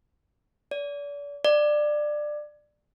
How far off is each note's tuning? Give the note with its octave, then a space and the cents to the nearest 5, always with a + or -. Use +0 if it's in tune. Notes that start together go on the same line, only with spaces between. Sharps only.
D5 -35
D5 +20